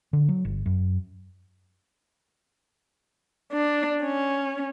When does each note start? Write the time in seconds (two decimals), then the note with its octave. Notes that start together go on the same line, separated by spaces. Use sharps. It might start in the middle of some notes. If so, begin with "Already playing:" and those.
0.13 D3
0.29 F#3
0.45 G1
0.66 F#2
3.53 D4
4.03 C#4